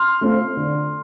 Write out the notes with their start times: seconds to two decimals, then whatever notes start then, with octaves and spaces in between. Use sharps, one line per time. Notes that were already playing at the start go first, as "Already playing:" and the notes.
Already playing: C6 F6
0.21 A3 C4 F4
0.57 D3